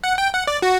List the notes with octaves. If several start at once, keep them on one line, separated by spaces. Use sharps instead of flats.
F#5
G5
F#5
D5
F#4